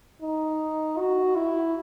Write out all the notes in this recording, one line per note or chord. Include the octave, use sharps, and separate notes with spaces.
D#4
F#4
E4